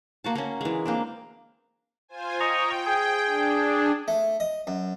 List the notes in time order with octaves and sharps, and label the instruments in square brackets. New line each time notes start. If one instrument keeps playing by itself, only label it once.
[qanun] A#3 F#4 A5
A#3 C#4
E3 G#3
A#3 C4 D4
[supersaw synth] F4 C5 G#5
[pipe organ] D#5 A#5 C#6 [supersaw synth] G5
[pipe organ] G#4
[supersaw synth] D4
[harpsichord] A3
D#5
F#2